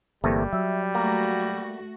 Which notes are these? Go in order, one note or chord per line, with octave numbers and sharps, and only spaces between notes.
G1 E2 C3 G3 A3 A#3
F#3 E5
A3 A#3 F#4